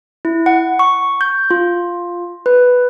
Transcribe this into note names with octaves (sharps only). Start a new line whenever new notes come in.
E4
F#5
C#6
G6
F4
B4